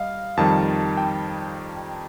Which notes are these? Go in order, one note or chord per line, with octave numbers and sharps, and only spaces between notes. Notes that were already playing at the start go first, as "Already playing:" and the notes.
Already playing: G3 D#5 F5
F2 D#3 G3 A5
G5